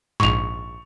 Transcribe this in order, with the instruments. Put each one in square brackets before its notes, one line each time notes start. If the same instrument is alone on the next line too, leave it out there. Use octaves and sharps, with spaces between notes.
[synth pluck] A#1 G#2 [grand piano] C#6 F7